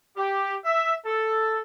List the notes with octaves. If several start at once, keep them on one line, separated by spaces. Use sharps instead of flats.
G4
E5
A4